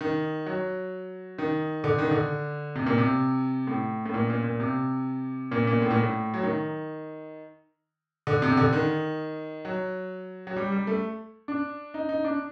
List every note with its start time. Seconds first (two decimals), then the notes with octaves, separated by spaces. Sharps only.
0.01 D#3
0.46 F#3
1.38 D#3
1.84 D3
1.98 D#3
2.11 D3
2.76 C3
2.86 A#2
2.98 C3
3.67 A2
4.06 A2
4.14 A#2
4.29 A#2
4.44 A#2
4.60 C3
5.52 A#2
5.67 A#2
5.82 A2
5.90 A#2
5.99 A2
6.34 F#3
6.43 D#3
8.27 D3
8.42 C3
8.57 D3
8.73 D#3
9.65 F#3
10.47 F#3
10.56 G3
10.72 G3
10.87 A3
11.48 D4
11.94 D#4
12.09 D#4
12.24 D4